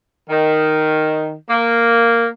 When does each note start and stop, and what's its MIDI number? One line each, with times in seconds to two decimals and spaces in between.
0.30 1.33 51
1.50 2.27 58